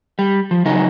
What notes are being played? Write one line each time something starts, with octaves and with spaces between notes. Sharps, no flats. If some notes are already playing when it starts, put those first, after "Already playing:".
G3
F3
C#3 F#3 D#4